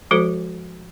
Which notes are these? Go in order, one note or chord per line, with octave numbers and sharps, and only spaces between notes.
F3 G#3 F#4 A4 C5